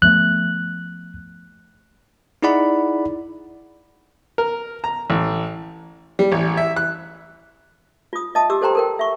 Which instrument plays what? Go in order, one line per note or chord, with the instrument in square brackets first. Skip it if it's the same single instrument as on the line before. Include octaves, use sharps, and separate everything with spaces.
[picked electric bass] F3 A3 B3 [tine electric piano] F#6
[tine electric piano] D#4 E4 G#4 D5 F#5 B5
[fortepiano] A#4
A#5
A1
G3
A1
E5
F#6
[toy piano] F4 D#6
D#5 E5 A5 D#6
G4 D6 E6
G4 A4 C5 G5 A#5 C6
A4 A#4 G5
E5 C#6